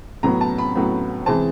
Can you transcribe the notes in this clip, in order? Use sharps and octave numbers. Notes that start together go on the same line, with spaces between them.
A2 F#3 B3 A#5
A5
B5
A2 F#3 B3
E3 G#3 C4 A5